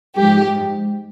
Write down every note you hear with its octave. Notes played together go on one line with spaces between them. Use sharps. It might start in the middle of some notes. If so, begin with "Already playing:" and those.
G#2 F3 G4